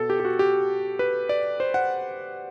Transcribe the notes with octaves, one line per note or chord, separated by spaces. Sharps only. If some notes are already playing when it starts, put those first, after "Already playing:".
Already playing: B2 A4
G4
G4
F#4
G4
B4
D5
C5
F#5